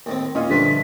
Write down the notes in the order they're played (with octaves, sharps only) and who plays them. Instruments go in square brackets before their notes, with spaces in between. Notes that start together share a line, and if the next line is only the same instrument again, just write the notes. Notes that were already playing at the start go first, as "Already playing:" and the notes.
[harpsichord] D#2 A2 C4
[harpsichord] A#2 [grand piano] C#4 F4 D#5
[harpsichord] G2 F3 A3 [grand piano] D3 [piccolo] B6